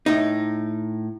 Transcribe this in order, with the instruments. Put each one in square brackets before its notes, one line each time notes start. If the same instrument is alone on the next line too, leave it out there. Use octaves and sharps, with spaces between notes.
[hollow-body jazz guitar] A2 D#4